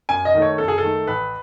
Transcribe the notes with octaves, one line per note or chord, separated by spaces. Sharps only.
F#2 G#5
D#5
D#3 A3
C#5
F#2 A4
G#4
A4
D#3 A3
A1 B4